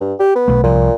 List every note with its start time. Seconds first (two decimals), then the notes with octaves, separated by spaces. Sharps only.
0.01 G2
0.19 G4
0.35 B3
0.48 B1 A3
0.63 C2 A#2 F3